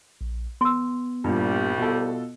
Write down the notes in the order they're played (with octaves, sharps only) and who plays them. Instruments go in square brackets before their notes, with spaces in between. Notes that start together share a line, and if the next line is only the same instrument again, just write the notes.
[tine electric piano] A#1
[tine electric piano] B3 [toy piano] C6 E6
[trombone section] C2 G3 [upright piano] G2 A#2
[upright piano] B2 F4 A4